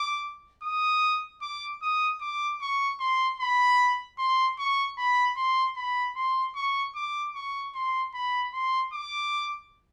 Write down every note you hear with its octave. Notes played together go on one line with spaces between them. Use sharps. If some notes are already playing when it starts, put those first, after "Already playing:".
Already playing: D6
D#6
D6
D#6
D6
C#6
C6
B5
C6
C#6
B5
C6
B5
C6
C#6
D6
C#6
C6
B5
C6
D6